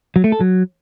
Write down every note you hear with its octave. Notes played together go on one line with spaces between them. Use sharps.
F#3
A3
A4
F#3